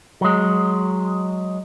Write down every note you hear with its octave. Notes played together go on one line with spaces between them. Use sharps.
F#3 G#3